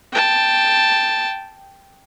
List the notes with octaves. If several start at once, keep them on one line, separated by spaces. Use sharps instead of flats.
G5 A5